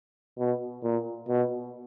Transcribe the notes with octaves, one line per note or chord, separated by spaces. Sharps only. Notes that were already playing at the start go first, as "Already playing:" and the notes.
B2
A#2
B2